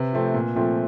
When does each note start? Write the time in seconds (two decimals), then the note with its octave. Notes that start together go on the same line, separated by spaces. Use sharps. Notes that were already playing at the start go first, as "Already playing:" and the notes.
Already playing: C3 B4
0.13 F3 A3 C4
0.34 A#2
0.55 F3 A3 C4